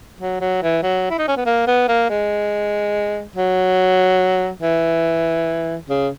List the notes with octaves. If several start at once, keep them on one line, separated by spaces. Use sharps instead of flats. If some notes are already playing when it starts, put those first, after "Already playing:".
F#3
F#3
E3
F#3
E4
D#4
C#4
B3
A#3
B3
A#3
G#3
F#3
E3
C#3